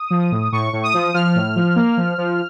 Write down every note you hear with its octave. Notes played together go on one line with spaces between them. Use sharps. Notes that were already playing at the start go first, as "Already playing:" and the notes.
Already playing: D#6
F3
A2
A2 C#6
A2
D#6
F3
F3 F6
A2
F3
A#3
F3
F3